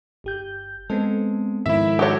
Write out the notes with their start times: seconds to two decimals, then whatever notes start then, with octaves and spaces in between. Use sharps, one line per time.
0.24 G1 G4 G6
0.90 G#3 B3 C4 A4
1.66 G#2 D#3 F3 E4 E5
1.99 E4 F#4 G4 A4 C#5